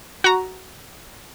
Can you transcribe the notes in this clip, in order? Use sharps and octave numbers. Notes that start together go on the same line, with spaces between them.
F#4 A#5